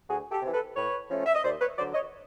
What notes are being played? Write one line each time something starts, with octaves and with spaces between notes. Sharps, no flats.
D2 F#4 G#4
G4 A4
C3 E3
A4 B4
A2 B4 C#5
F3 A3 C#4
E5
D#5
D#2 C5 D5
B4 C#5
D3 F#3 C5 D5
C#5 D#5